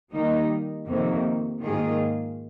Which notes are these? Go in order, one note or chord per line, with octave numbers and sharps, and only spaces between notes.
D#3 G3 A#3 D#4
F2 C3 D#3 A#3
G#2 D#3 A#3 F4 G#4